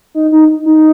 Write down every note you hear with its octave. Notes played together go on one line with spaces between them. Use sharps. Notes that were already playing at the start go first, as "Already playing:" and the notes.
D#4
D#4
D#4